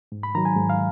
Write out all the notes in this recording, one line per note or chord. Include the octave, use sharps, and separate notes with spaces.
G#2
B5
D#3 F#3 A#5
G#5
G#2
F5